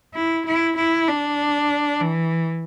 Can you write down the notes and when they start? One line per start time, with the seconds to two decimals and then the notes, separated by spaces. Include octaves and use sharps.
0.14 E4
0.46 E4
0.77 E4
1.08 D4
2.00 E3